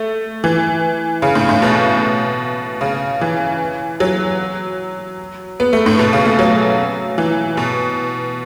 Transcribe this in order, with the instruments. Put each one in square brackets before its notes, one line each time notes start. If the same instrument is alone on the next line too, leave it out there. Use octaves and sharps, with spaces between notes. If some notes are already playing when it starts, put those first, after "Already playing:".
Already playing: [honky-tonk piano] A3
E3
C#3
A2
A2
B2
C#3
E3
F#3
B3
A3
A2
B2
C#3
A3
F#3
E3
B2